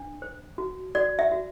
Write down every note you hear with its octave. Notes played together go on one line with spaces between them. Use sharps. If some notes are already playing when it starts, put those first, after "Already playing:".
Already playing: D4
C5
F#4
F#4 D5
E5
F#4